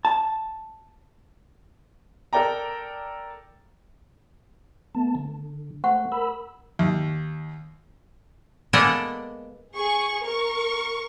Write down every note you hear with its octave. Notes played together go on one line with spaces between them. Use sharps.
A5
A4 A#4 D5 G5 A#5
A3 B3 A5
D3
A3 C5 F#5 C#6
A#4 B5 E6
D#2
G#3 A#3 B3 A4 D5 D#5
G#4 C#6
A#4 C#6